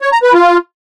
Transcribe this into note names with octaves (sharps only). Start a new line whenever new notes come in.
C#5
A#5
B4
F4